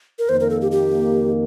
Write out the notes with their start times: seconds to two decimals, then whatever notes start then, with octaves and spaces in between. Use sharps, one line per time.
0.19 A#4
0.29 F2 D#3 A#3 C5
0.40 A#4
0.50 A4
0.61 G4
0.72 G4